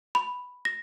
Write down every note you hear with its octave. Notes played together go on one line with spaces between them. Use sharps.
B5
A#6